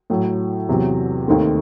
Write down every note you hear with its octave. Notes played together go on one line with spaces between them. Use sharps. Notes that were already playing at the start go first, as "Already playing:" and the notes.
A2 F#3 A3
E2 C3 F#3
D#2 D#3 A3 C4